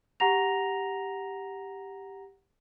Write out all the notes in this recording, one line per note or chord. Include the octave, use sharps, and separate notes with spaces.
G4 F#5 A#5 A#6 F7